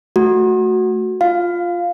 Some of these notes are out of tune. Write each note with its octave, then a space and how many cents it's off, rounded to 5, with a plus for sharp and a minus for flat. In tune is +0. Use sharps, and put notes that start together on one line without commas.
A3 +0 F#4 +0
F4 +0 F5 +0